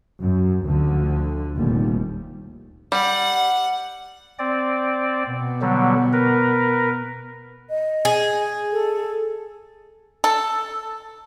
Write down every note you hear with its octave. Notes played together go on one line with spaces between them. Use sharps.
F#2
D2 D3 F3
F1 D#2 A#2 G3
G3 F#5
C4 D5
B2 B3
D3 F#3 G3
A#4 B4
D#5
G#4
A4
A4